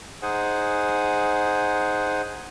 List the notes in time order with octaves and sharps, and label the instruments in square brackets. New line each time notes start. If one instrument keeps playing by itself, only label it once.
[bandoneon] D#4 G#4 C5 F#5 G#5